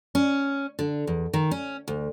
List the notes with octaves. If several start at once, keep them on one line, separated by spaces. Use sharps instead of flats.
C#4
D3
E2
D#3
C#4
D2